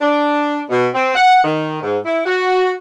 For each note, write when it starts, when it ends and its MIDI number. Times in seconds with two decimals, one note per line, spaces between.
0.01 0.61 62
0.70 0.87 47
0.95 1.10 60
1.15 1.41 78
1.44 1.79 51
1.83 1.98 44
2.05 2.21 64
2.26 2.72 66